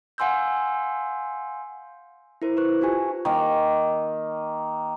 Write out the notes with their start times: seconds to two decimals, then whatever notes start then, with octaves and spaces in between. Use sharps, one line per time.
0.18 F5 F#5 G#5 C6 E6 G6
2.42 E4 A#4 C5
2.57 B4 C5 C#6 F#6
2.81 D#4 F4 G4 G#5 C#6
3.25 D#3 A#3